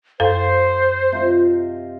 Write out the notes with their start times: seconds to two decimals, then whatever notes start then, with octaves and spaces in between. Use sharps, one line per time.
0.20 F#2 A4 C5 F5
1.12 C3 F4 D#5